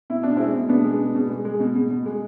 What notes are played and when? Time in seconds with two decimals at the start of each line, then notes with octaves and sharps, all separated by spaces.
0.10 B2 E4
0.23 B2 D4
0.37 G#3 C4 E4
0.54 B2
0.69 B2 B3 D4
0.84 G#3
1.00 B2
1.15 B2
1.30 G#3
1.45 G#3
1.60 B2
1.75 B2
1.90 B2
2.06 G#3